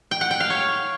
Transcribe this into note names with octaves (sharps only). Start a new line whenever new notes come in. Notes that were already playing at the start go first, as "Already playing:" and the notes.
G5
F#5
G5
F5
C#5